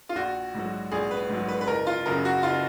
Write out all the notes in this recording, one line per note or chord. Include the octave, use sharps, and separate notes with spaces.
F4
A#1 F#4
G#2 F#3
A#1 G#4
B4
G#2 F#3
B4
B4
F#1 A#4
F4
F#2 C#3 A#4
F#4
F#1 F4